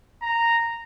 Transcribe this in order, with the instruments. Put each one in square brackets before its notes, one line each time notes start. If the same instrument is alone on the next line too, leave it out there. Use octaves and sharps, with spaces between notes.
[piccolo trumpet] A#5